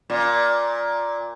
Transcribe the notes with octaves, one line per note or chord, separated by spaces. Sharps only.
A#2